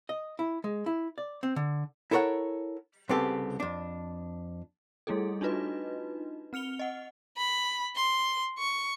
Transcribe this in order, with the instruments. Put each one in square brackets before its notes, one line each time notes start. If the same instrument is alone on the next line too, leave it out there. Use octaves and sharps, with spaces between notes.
[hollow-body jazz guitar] D#5
E4
G#3
E4
D5
C4
D3
E4 A4 A#4 C#5 F#5
C2 C#3 B3 C4 G4 A4
F2 D4
[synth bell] G3 A3 E4 G#4 A4
D4 D#4 F4 F#4 B4 D#5
C4 F6 C#7 F7 G7
D#5 F#5
[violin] B5
C6
C#6